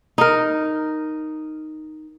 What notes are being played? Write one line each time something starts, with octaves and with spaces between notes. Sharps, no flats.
D#4 A#4